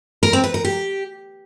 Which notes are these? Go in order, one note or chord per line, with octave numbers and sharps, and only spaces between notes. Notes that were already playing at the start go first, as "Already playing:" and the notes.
A#4
C4
B4
A#4
G4